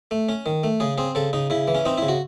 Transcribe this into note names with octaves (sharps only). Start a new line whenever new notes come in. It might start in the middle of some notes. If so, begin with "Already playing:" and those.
A3
C#4
D#3
A3
C#3 G#4
C4 G#4
C#3 A4
C#3 D#4
C#3 E4
E3
C#4
C4 D#4
C#3 E4
F#4